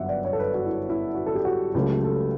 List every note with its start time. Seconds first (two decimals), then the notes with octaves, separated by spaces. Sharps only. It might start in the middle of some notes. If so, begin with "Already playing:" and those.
Already playing: G1 F#2 D3 G3 E5 F#5
0.09 D5
0.25 C#5
0.33 A4
0.39 B4
0.54 F#4
0.66 E4
0.90 E4
1.15 F#4
1.26 A4
1.35 G4
1.45 F#4
1.74 C#2 C#3 F#3 A3 G4
2.04 A4